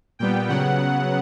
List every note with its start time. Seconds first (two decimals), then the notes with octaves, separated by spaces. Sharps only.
0.19 A#2 G3 B3 G5
0.49 C#3 F#3 B3 F#5